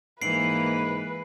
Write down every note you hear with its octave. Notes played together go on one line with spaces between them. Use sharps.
G#2 E3 A#3 B4 C7 D7 F#7